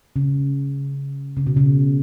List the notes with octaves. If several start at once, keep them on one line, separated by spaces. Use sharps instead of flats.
C#3
C#3
B2
C#3